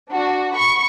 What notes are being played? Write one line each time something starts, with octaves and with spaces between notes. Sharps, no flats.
D4 F#4
B5 C#6